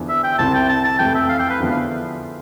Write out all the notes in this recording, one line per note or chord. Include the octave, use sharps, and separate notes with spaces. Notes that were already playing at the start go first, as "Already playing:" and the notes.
Already playing: E2 D3 F3
E5
G5
C2 C3 G3 C4 E4 A5
G5
A5
A5
F2 E3 A3 E4 G5
E5
F5
G5
B4
E2 D3 F3 B3
F5